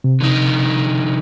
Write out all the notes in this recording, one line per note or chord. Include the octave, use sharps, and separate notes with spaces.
C3
D3 F3 D#4